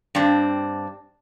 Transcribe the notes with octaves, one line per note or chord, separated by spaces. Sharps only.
G2 C4 D4